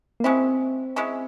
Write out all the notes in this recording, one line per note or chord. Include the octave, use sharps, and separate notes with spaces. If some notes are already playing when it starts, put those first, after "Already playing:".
A#3
G#3 C4 C#4 E4
G#3 C#4 E4